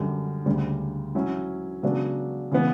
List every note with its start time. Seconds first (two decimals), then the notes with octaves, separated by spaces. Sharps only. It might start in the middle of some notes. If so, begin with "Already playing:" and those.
Already playing: F#2 D3 G3
0.46 D2 C#3 G3
1.15 F#3 C#4 E4
1.83 C#3 F#3 B3 D4 F#4
2.51 C#3 E3 B3